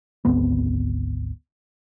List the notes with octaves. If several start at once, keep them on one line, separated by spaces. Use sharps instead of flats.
G#1 D2 B3 C4